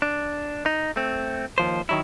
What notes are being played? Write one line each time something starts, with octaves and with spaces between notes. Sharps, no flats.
D4
D#4
A3 C4
D#2 F3 C5
D#3 F#3 E4